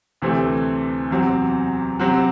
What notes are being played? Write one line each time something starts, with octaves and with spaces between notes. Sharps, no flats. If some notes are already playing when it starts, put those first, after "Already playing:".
D2 C3 E3 A3 C4
E2 C3 F#3 C4
C3 F#3 C4 F#4